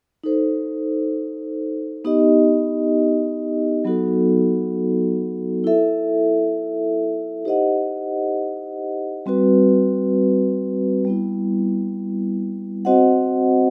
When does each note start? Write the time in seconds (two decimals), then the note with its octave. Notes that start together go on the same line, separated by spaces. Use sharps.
0.23 D#4 A4 C5
2.05 B3 D#4 G4 D#5
3.85 F#3 B3 D#4 F#4 A4
5.64 E4 A4 E5
7.45 D#4 G4 C5 D#5 F#5
9.26 G3 C4 F#4 B4
11.05 G3 B3 E4
12.85 C4 F#4 C5 D#5 F#5